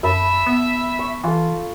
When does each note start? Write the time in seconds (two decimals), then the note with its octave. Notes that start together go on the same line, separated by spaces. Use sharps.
0.03 F#2 E5 A5 B5 E6
0.46 B3
0.99 C#6
1.24 E3 F4 A4